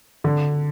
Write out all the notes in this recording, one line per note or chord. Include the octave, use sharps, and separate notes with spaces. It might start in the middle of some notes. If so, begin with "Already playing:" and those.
D3